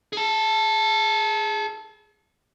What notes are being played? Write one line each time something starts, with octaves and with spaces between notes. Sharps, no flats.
G#4 A5